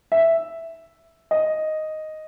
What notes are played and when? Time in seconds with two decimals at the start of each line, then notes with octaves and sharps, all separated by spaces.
0.12 E5
1.31 D#5